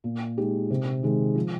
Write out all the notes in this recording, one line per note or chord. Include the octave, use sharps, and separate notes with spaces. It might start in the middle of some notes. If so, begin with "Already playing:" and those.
A#2
G#3 D#4 G4
C3
D#3 G#3
F3